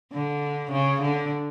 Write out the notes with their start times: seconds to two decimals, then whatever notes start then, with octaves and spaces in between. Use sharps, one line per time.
0.12 D3
0.71 C#3
1.01 D3